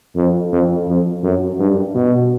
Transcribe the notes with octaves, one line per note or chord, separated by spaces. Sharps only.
F2
F2
F2
F#2
G2
B2